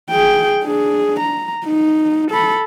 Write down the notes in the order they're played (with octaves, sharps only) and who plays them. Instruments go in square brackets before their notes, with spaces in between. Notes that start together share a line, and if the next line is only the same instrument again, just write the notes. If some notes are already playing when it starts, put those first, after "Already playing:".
[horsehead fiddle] G#4 G5
D4 G#4
A#5
D#4
A4 B5